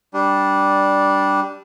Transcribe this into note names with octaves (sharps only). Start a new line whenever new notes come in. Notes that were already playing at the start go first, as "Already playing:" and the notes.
G3 D4